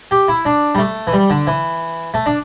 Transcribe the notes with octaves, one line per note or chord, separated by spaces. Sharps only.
G4
E4
D4
G3
A3
E3
G3
D3
E3
A3
D4